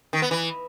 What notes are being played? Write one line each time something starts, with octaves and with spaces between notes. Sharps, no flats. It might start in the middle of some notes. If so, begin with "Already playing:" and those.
D#3
B3
E3